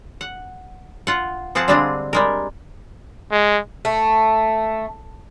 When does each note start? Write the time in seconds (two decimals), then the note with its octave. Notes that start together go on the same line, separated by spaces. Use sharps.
0.21 F#5
1.07 F4 F#5
1.55 F3 C4 G#4 F#5 A5
1.68 D3 G3 G#3 C4 D4 G#4
2.13 G3 G#3 A#4
3.32 G#3
3.85 A3